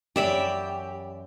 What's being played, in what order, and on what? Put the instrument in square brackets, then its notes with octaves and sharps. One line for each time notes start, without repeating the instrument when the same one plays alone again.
[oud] F#2 E3 C#5 [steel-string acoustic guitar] G4 [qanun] D5 E5 B5